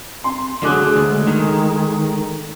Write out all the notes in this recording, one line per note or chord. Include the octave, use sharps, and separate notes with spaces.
C4 C6
D3 F#3 A3 F#4 G#4 D6 F#6
D2 G#3 A4
D#3